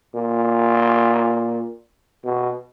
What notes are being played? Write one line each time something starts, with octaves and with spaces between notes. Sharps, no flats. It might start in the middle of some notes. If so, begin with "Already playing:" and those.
A#2
B2